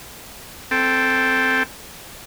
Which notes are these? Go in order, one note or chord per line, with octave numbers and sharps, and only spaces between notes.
C4 A4 G5